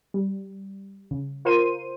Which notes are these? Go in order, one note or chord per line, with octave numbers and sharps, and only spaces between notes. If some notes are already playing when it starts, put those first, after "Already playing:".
G3
C#3
F4 A#4 C5 C6 D#7